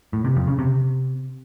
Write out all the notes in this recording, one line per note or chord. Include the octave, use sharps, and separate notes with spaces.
A2
C3
F2
C#3
C3